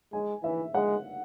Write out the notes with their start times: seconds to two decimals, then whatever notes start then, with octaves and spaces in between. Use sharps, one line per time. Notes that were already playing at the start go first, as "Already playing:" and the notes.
0.13 G#3 G#5
0.43 E3 E5
0.74 G#3 F#5